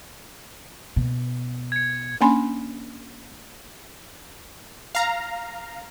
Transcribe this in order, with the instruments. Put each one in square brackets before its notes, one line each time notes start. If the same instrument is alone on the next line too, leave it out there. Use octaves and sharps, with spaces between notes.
[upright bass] B2
[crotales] G#6 C#7
[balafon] A#3 C#4 D4 G#5 B5 C6
[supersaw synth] F5 A#5